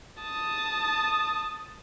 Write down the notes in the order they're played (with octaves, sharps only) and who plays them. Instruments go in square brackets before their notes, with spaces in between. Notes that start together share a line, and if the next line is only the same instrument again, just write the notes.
[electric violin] A5 D#6